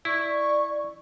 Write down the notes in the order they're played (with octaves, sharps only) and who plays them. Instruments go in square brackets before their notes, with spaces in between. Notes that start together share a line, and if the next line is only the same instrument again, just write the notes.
[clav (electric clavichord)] E4 [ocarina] D5 [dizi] C#6